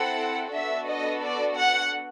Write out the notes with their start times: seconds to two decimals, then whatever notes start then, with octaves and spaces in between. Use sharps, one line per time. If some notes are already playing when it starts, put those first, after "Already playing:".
Already playing: C4 E4 A4 F#5
0.54 B3 D4 F#4 A4 E5
0.89 D#5
1.23 D5
1.59 F#5